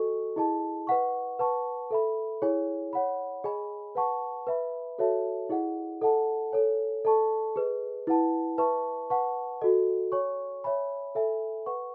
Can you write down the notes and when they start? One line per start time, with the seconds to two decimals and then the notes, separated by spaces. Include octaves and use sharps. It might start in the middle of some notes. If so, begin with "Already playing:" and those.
Already playing: F#4 A4 D#5 G#5 C#6
0.36 E4 G#4 D#5 A5
0.87 B4 D#5 F#5 C#6
1.39 B4 F#5 A5 C#6
1.91 A4 E5 B5
2.42 E4 G#4 C#5 G#5
2.93 C#5 F#5 B5
3.44 G#4 D#5 G#5 B5
3.95 B4 F#5 A5 C#6
4.47 B4 E5 B5
4.98 F#4 A4 C#5 E5 A5
5.49 E4 G#4 D#5 F#5
6.01 A4 D#5 F#5 A5
6.52 A4 C#5 G#5
7.05 A4 D#5 A5 C#6
7.56 G#4 B4 D#5
8.07 E4 B4 F#5 A5
8.58 B4 E5 A5 C#6
9.10 B4 F#5 A5 C#6
9.62 F#4 A4 D#5
10.12 C#5 G#5 C#6
10.64 C#5 E5 G#5 B5
11.15 A4 E5 G#5 B5
11.66 B4 F#5 C#6